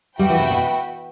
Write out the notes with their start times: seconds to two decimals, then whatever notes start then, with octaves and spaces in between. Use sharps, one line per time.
0.19 G3 F#4 B4 E5 G5
0.30 E3
0.40 C3
0.50 B2